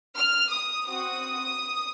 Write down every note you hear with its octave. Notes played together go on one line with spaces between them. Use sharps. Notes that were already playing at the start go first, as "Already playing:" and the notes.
F6
D#6
C4 F#4 D#6